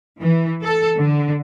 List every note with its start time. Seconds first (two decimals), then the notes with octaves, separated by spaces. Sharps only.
0.21 E3
0.63 A4
0.97 D3